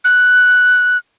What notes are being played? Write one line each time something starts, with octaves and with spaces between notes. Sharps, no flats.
F#6